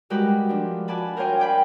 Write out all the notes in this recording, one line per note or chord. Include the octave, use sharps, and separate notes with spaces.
G3 G#3 F#4 G4 A#4 B4
F3 D4
F#4 D5 G#5 A5 B5
A#4 C5 C#5 F5 G5 G#5
D5 G5 B5